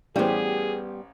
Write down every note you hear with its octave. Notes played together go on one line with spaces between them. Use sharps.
A1 G3 B3 G4 G#4 C5